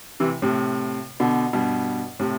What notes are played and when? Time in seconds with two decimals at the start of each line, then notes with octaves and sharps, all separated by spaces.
0.20 C3 E3
0.42 A2 C3
1.20 B2 D3
1.53 G2 B2
2.19 A2 C3